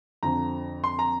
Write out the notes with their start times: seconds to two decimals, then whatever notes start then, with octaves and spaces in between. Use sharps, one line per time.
0.23 F2 D3 F3 A#5
0.84 C6
0.99 A#5